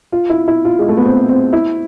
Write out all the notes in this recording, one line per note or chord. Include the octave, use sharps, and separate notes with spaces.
F4
E4
E4
F4
G#3
A3
B3
C4
C4
E4